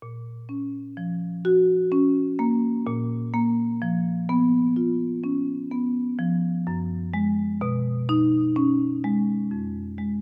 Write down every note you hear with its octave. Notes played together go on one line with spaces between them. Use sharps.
A#2
C#4
F3
F#4
C#4
A#3
A#2
A#3
F3
B3
F4
C#4
B3
F3
F#2
G#3
B2
D#4
C#4
G#3
F2
G#3